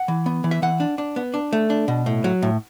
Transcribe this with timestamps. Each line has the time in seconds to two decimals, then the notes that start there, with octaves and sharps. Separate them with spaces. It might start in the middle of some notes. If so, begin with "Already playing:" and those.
Already playing: F#5
0.08 E3
0.26 B3
0.44 E3
0.51 E5
0.62 E3 F#5
0.80 D4
0.98 D4
1.16 B3
1.34 D4
1.53 A3
1.70 D4
1.88 B2
2.06 A2
2.24 F#3
2.42 A2